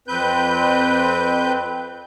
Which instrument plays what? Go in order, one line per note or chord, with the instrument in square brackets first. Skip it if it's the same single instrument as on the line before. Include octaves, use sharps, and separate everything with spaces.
[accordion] F2 C4 B4 G6